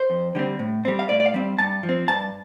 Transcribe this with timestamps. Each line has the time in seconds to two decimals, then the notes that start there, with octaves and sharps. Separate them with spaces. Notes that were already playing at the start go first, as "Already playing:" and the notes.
Already playing: C5
0.10 F2
0.35 D3 G3 C4
0.59 A2
0.85 G3 C4
0.99 F5
1.09 A2 D5
1.20 D5
1.26 F5
1.34 G3 C4
1.58 G2 A5
1.83 F3
1.89 C4
2.08 G2 A5